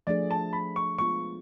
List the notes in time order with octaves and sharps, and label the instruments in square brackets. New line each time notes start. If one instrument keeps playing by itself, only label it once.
[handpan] F3 A3 D4 G#4 [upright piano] D5
[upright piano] A5
B5
C#6
[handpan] G#3 B3 F4 [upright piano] C#6